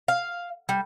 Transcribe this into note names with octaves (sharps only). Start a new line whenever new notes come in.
F5
G3